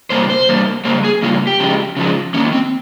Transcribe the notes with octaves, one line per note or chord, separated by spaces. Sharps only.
C3 G3 A#3 C5
C5
C3 G3 A#3
C#3 G3 A#3 C5
G#4
C#3 G3 A#3 F4
G4
C#3 F3 G#3
C#3 F3 G#3
D#3 A#3 C#4
C4